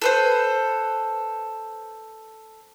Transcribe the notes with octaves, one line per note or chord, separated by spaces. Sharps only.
A4 B4 C5